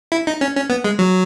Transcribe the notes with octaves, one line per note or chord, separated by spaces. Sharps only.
E4
D#4
C#4
C#4
B3
G#3
F#3